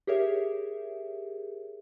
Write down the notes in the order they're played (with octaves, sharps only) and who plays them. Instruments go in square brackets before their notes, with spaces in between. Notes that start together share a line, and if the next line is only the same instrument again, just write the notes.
[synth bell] G4 G#4 A#4 C#5 E5